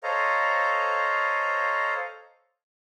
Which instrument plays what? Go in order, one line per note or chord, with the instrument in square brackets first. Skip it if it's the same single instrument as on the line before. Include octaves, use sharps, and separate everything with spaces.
[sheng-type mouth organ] A4 C5 C#5 D#5 F5 A#5